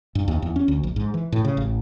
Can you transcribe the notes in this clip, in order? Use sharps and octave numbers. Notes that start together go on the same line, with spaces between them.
G2
D#2
E2
C#4
D2
A#1
G#2
E3
A2
C#3
A1